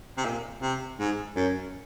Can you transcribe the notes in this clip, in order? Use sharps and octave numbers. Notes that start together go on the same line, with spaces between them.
C3
A#2
C3
G#2
F#2